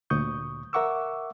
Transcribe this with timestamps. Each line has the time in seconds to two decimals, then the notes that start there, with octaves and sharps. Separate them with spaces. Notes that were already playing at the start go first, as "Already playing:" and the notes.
0.10 D2 A#2 C#6 D#6 G6
0.73 A#4 E5 F#5 C#6 D6 E6